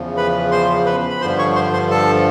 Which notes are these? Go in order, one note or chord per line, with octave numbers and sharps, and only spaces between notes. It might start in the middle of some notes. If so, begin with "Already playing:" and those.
Already playing: E2 C#3 F3
B4 B5
C5 C6
B4 B5
B5
G2 D3 F3 C5 C6
C#5 C#6
C5 C6
C5 C6
A4 A5